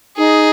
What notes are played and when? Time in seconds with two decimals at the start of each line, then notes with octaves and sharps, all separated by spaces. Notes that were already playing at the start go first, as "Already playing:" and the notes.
0.17 D#4 G#4